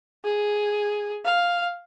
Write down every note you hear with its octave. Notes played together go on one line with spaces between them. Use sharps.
G#4
F5